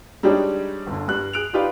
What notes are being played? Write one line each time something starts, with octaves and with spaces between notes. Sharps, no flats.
G3 G#3 D4 D#4 G4 C#5
G1 D3
G2 G3 F#6
G#4 F#6 D7 F7
D#4 F4 G4 B4 D5